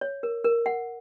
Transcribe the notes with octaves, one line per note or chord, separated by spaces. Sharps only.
C#5
A#4
A#4
F#5